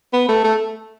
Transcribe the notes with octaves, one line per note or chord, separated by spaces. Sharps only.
B3
A3
A3